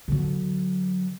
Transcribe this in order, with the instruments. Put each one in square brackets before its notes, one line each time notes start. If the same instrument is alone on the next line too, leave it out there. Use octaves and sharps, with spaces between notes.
[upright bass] D3 F#3